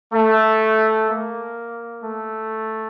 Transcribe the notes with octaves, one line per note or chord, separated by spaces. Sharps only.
A3
A#3
A3